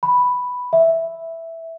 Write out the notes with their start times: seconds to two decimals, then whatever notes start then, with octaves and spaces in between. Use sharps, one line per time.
0.03 B5
0.73 E5